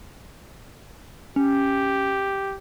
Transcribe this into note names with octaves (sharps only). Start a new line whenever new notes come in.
C#4 G4